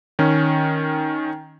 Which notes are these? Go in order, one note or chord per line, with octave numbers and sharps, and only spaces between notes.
D#3 C#4